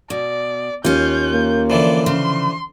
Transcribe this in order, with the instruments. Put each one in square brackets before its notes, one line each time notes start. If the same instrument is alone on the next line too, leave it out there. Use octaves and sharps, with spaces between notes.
[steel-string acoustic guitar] B2 [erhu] D5
[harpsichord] D#2 [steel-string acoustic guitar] C#4 F4 [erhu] G6
[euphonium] A#3
[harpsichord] D3 E3 F3 [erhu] D5
[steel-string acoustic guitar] C#3 [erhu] C6